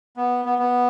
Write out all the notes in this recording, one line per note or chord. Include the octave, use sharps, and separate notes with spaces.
B3
B3
B3